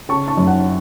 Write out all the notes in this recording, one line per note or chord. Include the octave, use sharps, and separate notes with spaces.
C#3 A5 C#6
A5 C#6
F#2
F#5 A5